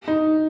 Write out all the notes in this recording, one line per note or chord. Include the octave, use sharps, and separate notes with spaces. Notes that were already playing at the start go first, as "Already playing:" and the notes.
D#4